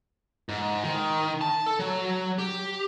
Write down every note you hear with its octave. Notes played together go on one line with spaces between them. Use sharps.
G#2
D#3
A5
A4
F#3
G4